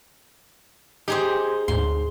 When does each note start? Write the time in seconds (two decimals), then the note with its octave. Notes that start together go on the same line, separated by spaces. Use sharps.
1.08 D#4 G4 G#4 C5
1.68 D2 G#2 C6